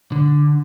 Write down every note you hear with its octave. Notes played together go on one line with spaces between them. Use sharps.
D3